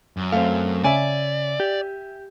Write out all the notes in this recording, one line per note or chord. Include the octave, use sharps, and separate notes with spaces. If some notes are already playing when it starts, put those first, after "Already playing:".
F#2
A3 C4 F5
C#3 D5 E5 G#5
G4